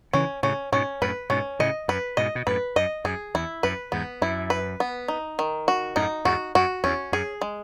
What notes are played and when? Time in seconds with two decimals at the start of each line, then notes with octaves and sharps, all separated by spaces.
0.13 C#3 E3 C#4
0.43 A2 C#3 C#4
0.72 G#2 B2 C#4
1.02 F#2 A2 B4
1.30 G#2 B2 C#4
1.59 A2 C#3 D#5
1.88 F#2 B4
2.17 G#2 B2 D#5
2.35 B2
2.47 F#2 A2 B4
2.76 F#2 D#5
3.04 F#2 G#4
3.35 E2 E4
3.63 F#2 B4
3.92 E2 G#2 B3
4.21 F#2 E4
4.50 B4
4.80 B3
5.08 D#4
5.39 D#3
5.68 F#4
5.96 F#2 A2 D#4
6.25 E2 G#2 F#4
6.55 F#2 F#4
6.84 E2 C#4
7.12 F#2 G#4
7.42 G#3